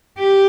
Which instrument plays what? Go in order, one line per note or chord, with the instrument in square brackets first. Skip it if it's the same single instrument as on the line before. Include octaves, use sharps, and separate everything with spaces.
[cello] G4